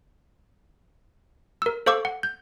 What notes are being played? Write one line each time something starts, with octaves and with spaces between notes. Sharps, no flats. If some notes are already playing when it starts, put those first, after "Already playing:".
A#4 E6
A4 C5 F5 C#6 D6 E6
F#5
G6